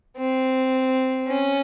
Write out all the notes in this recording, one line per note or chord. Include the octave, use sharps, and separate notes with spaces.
C4
C#4